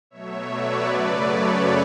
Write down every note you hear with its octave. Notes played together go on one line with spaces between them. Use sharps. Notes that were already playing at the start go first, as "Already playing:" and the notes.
B2 F#3 A3 C#5 E5
B4 D5
F#2 C#3 F#3 A3
A4 C#5